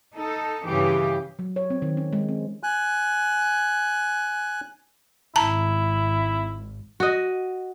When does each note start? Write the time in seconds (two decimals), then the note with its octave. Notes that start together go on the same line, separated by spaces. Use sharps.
0.15 D#4 A4
0.66 G2 C#3 E3 G4
1.39 F#3
1.56 C#5
1.70 C4
1.82 D#3
1.97 C#4
2.13 G#3
2.28 C4
2.63 G#5 F#6
5.36 G#1 E4 A5 A#5
7.00 F#4 D#5